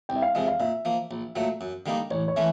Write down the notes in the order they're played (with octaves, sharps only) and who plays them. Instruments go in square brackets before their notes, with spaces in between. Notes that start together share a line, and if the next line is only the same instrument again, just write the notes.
[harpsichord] C2 [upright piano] G5
[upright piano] E5
F5
[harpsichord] C3 F3 G#3 [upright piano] E5
[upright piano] F5
[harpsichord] A#2 [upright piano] E5
[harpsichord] F3 A#3
A#1
A#2 F#3 A3
F#2
D3 G3 A#3 D#4
[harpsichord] A1 [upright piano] C#5
[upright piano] C#5
[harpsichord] E3 A3 C#4